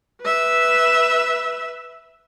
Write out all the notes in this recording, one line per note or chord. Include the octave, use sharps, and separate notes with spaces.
B4 E5